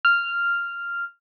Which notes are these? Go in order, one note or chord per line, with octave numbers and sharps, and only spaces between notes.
F6